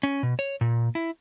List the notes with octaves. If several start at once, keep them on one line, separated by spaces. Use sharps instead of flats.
C#4
B2
C#5
A#2
E4